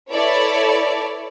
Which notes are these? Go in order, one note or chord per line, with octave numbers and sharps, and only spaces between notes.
E4 A4 B4 C#5 D5